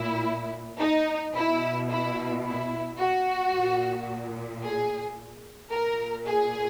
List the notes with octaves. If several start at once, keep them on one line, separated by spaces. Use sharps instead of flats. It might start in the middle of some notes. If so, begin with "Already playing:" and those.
Already playing: A#2 E4
D#4
B2 E4
E4
E4
F#4
A#2
G#4
A#2 A#4
G#4